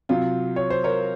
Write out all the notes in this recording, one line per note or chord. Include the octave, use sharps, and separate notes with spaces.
C3 F#3 F4
C#5
C5
A#4 C#5